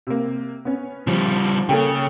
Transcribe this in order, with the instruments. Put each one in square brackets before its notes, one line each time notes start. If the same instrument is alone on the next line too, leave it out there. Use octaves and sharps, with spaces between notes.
[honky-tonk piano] C3 A#3
B3 C#4
[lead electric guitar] C#3 G3 [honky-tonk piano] F3
[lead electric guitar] C#3 [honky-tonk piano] A#3 A4 G5